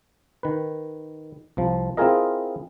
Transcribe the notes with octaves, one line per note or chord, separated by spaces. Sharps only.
D#3 B4
C2 F3
C4 E4 F4 G#4 A#4 D#5